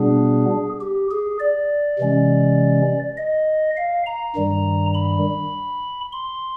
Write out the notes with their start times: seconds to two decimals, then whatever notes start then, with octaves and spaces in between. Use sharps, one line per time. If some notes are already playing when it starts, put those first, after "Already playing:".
Already playing: B2 G3 B3 D4 G#4
0.81 G4
1.11 G#4
1.40 D5
1.99 C3 E3 G#3 C#4
3.17 D#5
3.77 F5
4.06 A#5
4.36 G2 D#3 G3
4.94 B5
6.12 C6